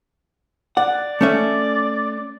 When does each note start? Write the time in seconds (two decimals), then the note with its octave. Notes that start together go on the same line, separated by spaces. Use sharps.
0.77 D5 F#5
1.21 A3 C#4 E5